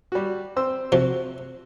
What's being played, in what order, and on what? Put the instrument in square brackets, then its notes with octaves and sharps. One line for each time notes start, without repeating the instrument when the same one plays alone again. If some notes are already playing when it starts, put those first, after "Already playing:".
[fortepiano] G3 F#4
C4 C5 E6
[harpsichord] C3 F3 [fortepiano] F#4